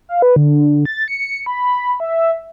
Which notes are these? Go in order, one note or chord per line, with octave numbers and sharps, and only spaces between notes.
F5
B4
D3
A6
C#7
B5
E5